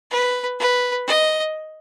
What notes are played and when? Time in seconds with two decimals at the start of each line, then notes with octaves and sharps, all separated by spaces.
0.10 B4
0.59 B4
1.07 D#5